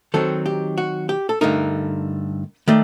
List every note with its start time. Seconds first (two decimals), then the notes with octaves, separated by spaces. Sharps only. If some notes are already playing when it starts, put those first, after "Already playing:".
0.14 D#3 F#3 C4 D#4 A4
0.46 G4
0.78 F#4
1.09 G4
1.29 A4
1.41 G2 D3 A3 D#4 A#4
2.68 D#3 A3 D5